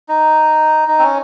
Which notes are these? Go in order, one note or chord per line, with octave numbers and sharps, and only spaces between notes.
D#4
D#4
C4
C#4